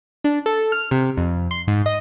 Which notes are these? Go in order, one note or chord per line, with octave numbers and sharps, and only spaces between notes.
D4
A4
F6
C3
F2
C6
G#2
D#5